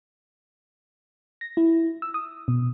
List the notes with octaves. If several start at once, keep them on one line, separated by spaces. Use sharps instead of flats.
A#6
E4
E6
D#6
B2